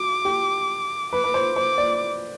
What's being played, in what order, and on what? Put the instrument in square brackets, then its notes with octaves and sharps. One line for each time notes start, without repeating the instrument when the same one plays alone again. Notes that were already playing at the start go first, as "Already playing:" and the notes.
Already playing: [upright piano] F#4 [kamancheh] D6
[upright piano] G4
[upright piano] B4 [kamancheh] D6
[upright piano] B4
C5
[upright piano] C5 [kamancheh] D6
[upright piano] D5